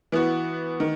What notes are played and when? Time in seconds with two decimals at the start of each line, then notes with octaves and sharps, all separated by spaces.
0.12 E3 B3 F#4
0.80 D#3